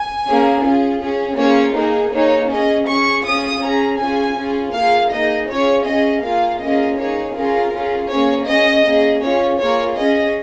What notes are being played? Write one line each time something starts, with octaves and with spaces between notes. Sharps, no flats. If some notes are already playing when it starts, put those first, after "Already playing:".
Already playing: G#5
A#3 C#4 G#4
C#4 F4 G#4
C#4 G#4
A#3 C#4 F4 G#4 C#5
A#3 D#4 G#4 A#4
A#3 D#4 G#4 C#5
C#4 G#4 D#5
C#4 G#4 C#6
C#4 F4 G#4 D#6
C#4 G#4 A#5
C#4 F4 G#4 G#5
C#4 F4 G#4
A#3 F4 G#4 F5
A#3 D#4 G#4 D#5
C#4 F4 G#4 C#5
C#4 G#4 D#5
A#3 F4 G#4 F5
A#3 C#4 F4 G#4 D#5
A#3 D#4 G#4 C#5
C#4 F4 G#4 A#4
C#4 F4 G#4
A#3 C#4 G#4 C#5
C#4 G#4 D#5
A#3 C#4 G#4
C#4 F4 G#4 C#5
A#3 F4 G#4 C#5
C#4 G#4 D#5